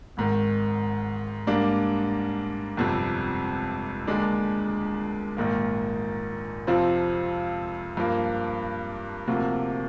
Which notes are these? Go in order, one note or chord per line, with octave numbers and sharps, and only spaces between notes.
G#1 G#2 D#3
G#2 G3 A#3 D4
G1 F2 C3 G3
D#2 D3 G#3 D4
A#1 G#2 D#3 A#3
F2 C3 F3 C4 F4
G2 F3 A#3
D2 C3 F3 A#3